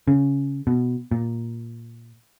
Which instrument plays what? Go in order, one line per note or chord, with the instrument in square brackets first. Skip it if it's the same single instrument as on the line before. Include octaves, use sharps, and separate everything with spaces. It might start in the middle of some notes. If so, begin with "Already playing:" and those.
[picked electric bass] C#3
B2
A#2